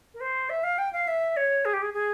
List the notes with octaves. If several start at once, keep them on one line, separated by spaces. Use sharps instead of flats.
A#4
C5
E5
F5
G5
F5
E5
C#5
G#4
G4
G#4
G#4